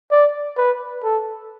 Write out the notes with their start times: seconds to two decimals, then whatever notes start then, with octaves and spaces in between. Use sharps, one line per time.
0.11 D5
0.57 B4
1.04 A4